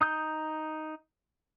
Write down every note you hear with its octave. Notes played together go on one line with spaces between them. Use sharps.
D#4 D#6 G6